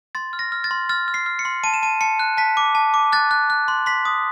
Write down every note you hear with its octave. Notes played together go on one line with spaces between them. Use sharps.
C6 A6
F6
A#6
F6
A6
C6
F6 A6
F6
C7
F6
C#7
C6
A5 D#7
E7
A5 D#7
A5 C#7
F#6
A5 B6
D6
A5
D6
F#6 A6
F#6
F#6
C6
C6 B6
D#6